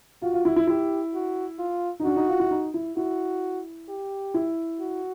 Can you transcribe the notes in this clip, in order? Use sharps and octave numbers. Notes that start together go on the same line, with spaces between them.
F4 F#4
F4
E4
E4
E4 G4
F#4
F4
D#4
D4 F#4
D#4
F4
E4
D#4
E4
E4 F#4
G4
E4
F#4